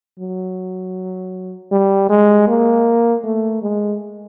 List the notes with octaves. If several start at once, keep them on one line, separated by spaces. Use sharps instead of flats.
F#3
G3
G#3
A#3
A3
G#3